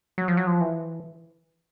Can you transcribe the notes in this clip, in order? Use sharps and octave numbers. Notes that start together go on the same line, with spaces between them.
F#3
F3
F#3
F3
E3